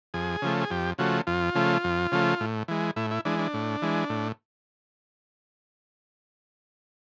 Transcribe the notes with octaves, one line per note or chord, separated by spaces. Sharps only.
F2 G#4
C#3 F3 A3
G#4
F2 G4
C#3 F3 A3 F#4
F2 F4
C#3 F3 A3
F2
C#3 F3 A3
A2
E3 G#3
A2 E4
E4
E3 G#3 D4
D4
A2
E3 G#3
A2